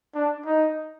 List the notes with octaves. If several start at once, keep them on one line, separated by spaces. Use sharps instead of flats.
D4
D#4